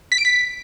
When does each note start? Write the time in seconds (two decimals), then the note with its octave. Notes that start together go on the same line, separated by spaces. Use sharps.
0.12 B6
0.18 D7
0.25 B6